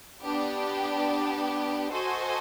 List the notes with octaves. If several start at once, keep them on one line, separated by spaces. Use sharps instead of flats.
B3 D4 G4
F#4 A4 C5 D#5 G#5